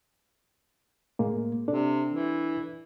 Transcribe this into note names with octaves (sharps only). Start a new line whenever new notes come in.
A2 G#3 A#3
C3 D4 A4 D5
E3